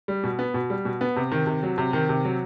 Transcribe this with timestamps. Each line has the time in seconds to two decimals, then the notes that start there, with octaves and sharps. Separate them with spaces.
0.08 G3
0.24 B2
0.39 B3
0.54 B2
0.70 G3
0.85 B2
1.01 B3
1.16 C3
1.32 D#3
1.47 C3
1.63 F#3
1.78 C3
1.93 D#3
2.09 C3
2.25 F#3